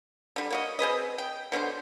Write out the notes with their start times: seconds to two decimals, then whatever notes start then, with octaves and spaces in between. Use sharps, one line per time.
0.36 D3 G3
0.50 A#3 F#4 D#5
0.79 C4 G#4 B4 D#5
1.18 G5
1.52 B2 D3 C4 C5